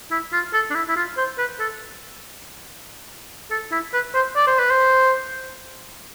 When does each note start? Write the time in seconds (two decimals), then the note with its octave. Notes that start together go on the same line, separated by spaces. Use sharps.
0.11 E4
0.33 F4
0.54 A4
0.70 D4
0.75 E4
0.88 E4
0.96 F4
1.17 C5
1.38 B4
1.60 A4
3.51 A4
3.72 E4
3.93 B4
4.15 C5
4.36 D5
4.47 C5
4.59 B4
4.70 C5